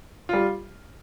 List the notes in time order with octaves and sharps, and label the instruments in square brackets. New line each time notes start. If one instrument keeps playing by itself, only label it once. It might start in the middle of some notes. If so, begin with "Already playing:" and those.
[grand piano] G3 F4